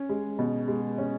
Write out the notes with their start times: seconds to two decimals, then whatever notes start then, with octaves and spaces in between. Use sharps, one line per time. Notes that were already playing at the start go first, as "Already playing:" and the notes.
Already playing: C#4
0.09 G#3
0.39 B2
0.68 G#3
0.98 C#4